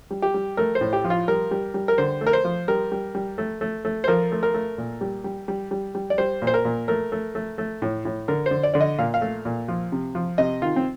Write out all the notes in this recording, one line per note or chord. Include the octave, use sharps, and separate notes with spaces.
G3
G4
G3
A3 A#4
C5
A2
G4
F3
F4
G3 A#4
G3
G3
A#4
D3 C5
A3
A#4
C5
F3
G3 A#4
G3
G3
A3
A3
A3
C5
F3 A#4
A3
A#4
A3
A#2
G3
G3
G3
G3
G3
D5
G3 C5
A#2
C5
A#4
A#2
A3 A#4
A3
A3
A3
A2
A2
D3 A#4
C5
D3
D5
D3 D5
D#5
A#2 F5
F5
A3
A#2
F3
C3
F3
C3 D#5
D#3 F4
C4